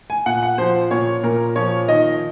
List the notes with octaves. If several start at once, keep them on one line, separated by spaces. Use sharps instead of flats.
G#5
A#2 F#5
F#5
F3 C5
A#2 C#5
A#2 A#4
F3 C#5
D#3 D#5